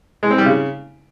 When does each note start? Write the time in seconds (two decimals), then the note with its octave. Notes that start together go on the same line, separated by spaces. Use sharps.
0.23 G#3
0.30 C4
0.38 G3
0.46 C#3